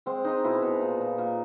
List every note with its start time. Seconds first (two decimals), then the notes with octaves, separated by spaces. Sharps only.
0.06 G#3 C4
0.25 G#3 D#4
0.44 B2 E4
0.62 B2 D#4
0.81 A#2
1.00 A#2
1.18 A#2